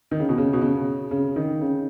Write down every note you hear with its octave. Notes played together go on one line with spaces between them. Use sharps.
D#3
C#3
B2
C#3
B2
C#3
C#3
D#3
C#3